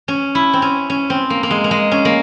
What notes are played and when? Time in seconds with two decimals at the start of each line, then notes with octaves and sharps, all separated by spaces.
0.08 C#4
0.35 E4
0.53 C4
0.62 C#4
0.90 C#4
1.10 C4
1.30 A#3
1.43 A#3
1.51 G#3
1.64 A#3
1.71 G#3
1.92 C#4
2.05 A#3